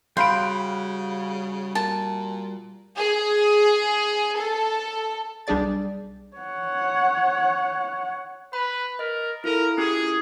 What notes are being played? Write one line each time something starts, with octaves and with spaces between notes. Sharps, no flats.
C#3 G3 F#4 F5 G5 B5 C6 D7
A#2 A5
G#4
A4
B1 G3 D4 G#4 D5 A6
C#5 F#5
B4 B5
A#4 D#5
E4 F4 A4 A#4
C#4 E4 G4 G#4